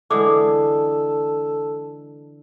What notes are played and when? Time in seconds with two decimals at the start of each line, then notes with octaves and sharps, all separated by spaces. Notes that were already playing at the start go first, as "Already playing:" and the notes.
0.11 D3 E3 G#3 A4 D6 D#6